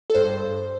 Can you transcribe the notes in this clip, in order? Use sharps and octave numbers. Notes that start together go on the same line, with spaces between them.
A4
G2 C5